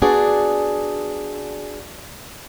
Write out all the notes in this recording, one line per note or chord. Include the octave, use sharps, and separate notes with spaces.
B3 D4 F#4 G#4 D5